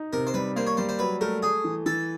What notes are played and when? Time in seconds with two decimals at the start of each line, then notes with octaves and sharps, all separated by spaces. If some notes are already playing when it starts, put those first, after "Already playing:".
Already playing: D#4
0.13 C3 A#4
0.27 C5
0.34 G3 B4
0.56 A#3 C5
0.67 C#5
0.77 G3 C5
0.89 C5
0.99 F#3 B4
1.21 A3 A#4
1.42 A3 G#4
1.64 E3
1.86 E3 A4